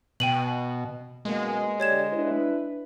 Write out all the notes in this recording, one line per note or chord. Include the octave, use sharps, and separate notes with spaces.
B2 G5 D#7 F#7
F#2 B2 G#3 A#3
D3 G4 C#5 D5 G#6 E7
D4 E4 B4